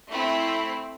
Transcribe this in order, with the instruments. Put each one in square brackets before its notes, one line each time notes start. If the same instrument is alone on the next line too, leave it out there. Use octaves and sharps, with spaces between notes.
[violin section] A3 C4 E4